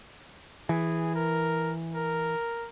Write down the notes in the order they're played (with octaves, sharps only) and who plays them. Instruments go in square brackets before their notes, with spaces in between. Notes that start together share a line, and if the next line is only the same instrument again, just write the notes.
[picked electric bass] E3 [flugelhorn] G#4
[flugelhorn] A#4
A#4